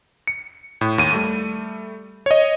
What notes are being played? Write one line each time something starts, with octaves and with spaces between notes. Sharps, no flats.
C#7
A2
D#2 D#7
G3 A3 D#7
C#5 D#5